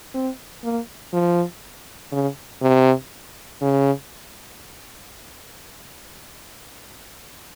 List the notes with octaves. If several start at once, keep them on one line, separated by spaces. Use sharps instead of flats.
C4
A#3
F3
C#3
C3
C#3